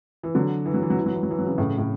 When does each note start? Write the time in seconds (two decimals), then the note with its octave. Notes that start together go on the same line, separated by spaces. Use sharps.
0.23 E3
0.35 D3 F#3
0.66 E3
0.74 F#3
0.83 E3
0.90 F#3
0.98 E3
1.06 F#3
1.15 E3
1.23 F#3
1.31 E3
1.38 F#3
1.47 C#3 E3
1.58 A2 C#3
1.78 A2